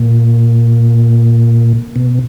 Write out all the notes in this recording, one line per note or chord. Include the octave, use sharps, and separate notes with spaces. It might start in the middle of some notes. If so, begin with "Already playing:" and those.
Already playing: A#2
B2